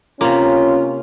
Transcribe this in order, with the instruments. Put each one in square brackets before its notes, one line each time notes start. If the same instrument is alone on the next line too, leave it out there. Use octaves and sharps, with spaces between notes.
[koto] C3 A#3 [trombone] C#4 [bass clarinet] F4